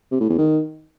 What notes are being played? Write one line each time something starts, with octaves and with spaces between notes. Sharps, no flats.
C3
A2
E2
D#3